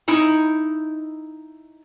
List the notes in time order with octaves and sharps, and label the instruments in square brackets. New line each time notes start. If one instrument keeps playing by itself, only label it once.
[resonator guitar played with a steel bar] D#4 E4 A#5